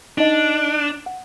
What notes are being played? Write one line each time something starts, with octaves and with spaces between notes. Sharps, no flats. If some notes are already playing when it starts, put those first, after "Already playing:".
D4 D#4 D#5
F#5